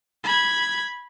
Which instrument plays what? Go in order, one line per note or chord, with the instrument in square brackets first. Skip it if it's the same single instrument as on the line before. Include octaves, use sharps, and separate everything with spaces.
[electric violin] B5 G#6